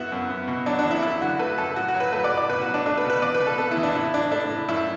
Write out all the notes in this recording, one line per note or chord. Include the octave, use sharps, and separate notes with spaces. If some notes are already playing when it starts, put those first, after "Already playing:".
Already playing: F#2 E3 B3 E4 F#4
F#2
B3
B2
F#3 D4
D4
E2
E4
F#2 E4
D3 F#4
A3 B4
F#2 A4
A2 F#4
F#4
F#3
B4
A3 B4
D5
A2
D5
B2 B4
F#4
F#3
D4
A3 D4
B4
B2
B4
E2 D5
B4
B2
A4
B3 A4
E4
E2
D4
A2 E4
E3 D4
A3 D4
A2
F#2 E4